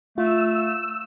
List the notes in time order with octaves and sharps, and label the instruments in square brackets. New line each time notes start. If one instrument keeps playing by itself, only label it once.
[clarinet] A3 [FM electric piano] F4 [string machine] E6